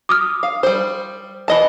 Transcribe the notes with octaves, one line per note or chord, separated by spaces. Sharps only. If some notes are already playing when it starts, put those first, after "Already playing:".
D6 D#6 F6
F5
G3 C5
E3 D#5 A5